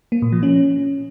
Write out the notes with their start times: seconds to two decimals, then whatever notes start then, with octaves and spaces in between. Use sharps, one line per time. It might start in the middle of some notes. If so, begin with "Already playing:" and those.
0.12 A#3
0.22 A#2
0.32 F3
0.43 C#4